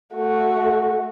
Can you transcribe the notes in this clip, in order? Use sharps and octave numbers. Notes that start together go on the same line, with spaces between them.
A3 F#4